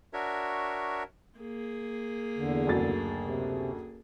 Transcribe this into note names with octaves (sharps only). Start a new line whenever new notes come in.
D4 F#4 A#4 C#5 E5
A#3 G#4
E2 D3
F#1 D2 A6
C3